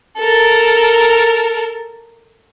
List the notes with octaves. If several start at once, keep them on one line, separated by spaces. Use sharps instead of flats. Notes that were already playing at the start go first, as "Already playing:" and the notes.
A4 A#4